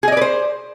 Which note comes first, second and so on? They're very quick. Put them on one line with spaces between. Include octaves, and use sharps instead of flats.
G#4 D#5 D5 B4 C5